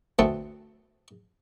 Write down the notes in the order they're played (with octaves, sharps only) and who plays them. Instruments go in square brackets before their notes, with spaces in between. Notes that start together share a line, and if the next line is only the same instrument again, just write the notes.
[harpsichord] D2 A3 B3 C4 F#5 A5